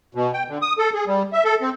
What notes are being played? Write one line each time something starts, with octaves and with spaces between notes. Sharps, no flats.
B2
G5
D3
D#6
A4
G#4
G3
E5
A4
C4